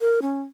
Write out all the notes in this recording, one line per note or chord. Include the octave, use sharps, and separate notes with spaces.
A#4
C#4